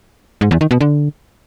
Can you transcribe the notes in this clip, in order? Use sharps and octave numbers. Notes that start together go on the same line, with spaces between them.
G#2
E2
D#3
B2
D3